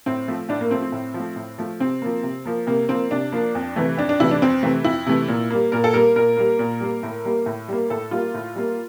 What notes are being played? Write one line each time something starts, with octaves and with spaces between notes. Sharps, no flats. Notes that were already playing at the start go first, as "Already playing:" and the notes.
A2 C4
F3 A3
A2 D4
A#3
F3 A3 C4
C4
A2
F3
A3
A2
F3 A3
C3 C4
F3 A#3
C3
F3 A#3
C3 A#3
F3 A#3 C4
C3 D4
F3 A#3
F2
C3 E3 A3
F2 D4
D4
C3 E3 A3 E4
D4
F2 C4
C3 E3 A3
F2 E4
C3 E3 A3
A#2
G3 A#3
A#2 A#4
A4
G3 A#3 A#4
A#2 A#4
G3 A#3
A#2
G3 A#3
A2
G3 A#3
A2
G3 A#3
A2 A4
G3 A#3 F4
A2
G3 A#3